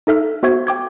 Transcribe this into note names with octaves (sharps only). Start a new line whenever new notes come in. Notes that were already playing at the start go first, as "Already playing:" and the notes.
D#4 A4 E5 F6
B3 F#4 C5 E5 C#6 G#6
G5 D6 G#6